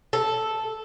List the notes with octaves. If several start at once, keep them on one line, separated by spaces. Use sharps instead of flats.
A4